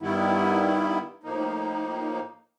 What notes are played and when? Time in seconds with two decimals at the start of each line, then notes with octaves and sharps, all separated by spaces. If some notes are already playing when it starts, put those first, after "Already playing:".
0.01 G2 D#3 G3 B3 E4
1.23 A2 F3 A#3 D#4